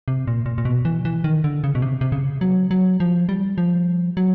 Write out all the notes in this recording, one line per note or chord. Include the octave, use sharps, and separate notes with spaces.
C3
A#2
A#2
A#2
B2
E3
E3
D#3
D3
C#3
B2
C3
C3
C#3
F#3
F#3
F3
G3
F3
F#3